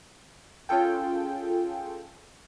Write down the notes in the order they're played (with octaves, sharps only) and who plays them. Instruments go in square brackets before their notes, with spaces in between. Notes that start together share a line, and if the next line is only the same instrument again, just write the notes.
[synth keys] C#4 F4 G#4 A4 G5